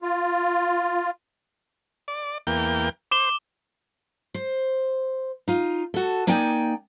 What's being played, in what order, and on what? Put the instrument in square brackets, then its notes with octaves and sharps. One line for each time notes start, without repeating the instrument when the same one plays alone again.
[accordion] F4
[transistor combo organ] D5
E2 A#3 G5
[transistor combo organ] C5 [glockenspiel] D6 E7 G7
[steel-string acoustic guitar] C5
D#4 F4
F#4 A4
A#3 D#4 D5 G5 G#5